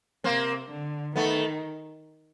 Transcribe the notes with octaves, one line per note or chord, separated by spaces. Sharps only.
C3 A#3 C4
D3
D#3 A3 B3